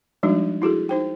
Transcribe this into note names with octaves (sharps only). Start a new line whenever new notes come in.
F3 G3 G#3 D4 D#4 F#4
E4 F#4 G#4 A4
D#4 C5 G5